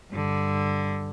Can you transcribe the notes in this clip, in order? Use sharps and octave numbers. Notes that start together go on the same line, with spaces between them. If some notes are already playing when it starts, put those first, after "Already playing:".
G2 D3